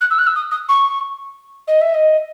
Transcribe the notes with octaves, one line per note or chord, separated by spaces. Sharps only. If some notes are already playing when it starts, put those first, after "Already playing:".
F#6
E6
F#6
E6
D#6
D#6
C#6
D#5
E5
D#5